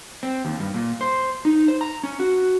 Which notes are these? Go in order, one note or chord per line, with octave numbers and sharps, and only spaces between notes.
C4
D#2
G2
A#2
C5
D#4
C5
A#5
C#4
F#4